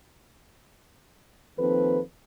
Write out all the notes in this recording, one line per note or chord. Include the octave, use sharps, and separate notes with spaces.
D#2 D#3 F3 C4 A4 B4